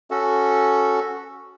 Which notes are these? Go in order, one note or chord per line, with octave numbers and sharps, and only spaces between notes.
C#4 F#4 A4